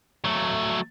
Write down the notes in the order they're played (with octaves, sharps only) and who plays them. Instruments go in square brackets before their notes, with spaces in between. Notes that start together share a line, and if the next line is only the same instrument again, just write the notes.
[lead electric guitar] F#3 A3